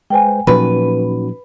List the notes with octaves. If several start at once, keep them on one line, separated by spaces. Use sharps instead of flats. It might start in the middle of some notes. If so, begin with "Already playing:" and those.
G#3 B4 C5 G5 G#5
A#2 F3 F#3 C#4 D#4 F#4 B4